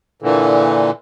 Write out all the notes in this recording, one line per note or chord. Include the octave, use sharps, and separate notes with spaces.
A#2 D3 E3